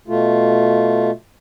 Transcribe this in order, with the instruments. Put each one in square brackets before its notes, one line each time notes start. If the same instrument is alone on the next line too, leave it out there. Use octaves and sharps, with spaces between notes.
[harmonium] B2 A3 F4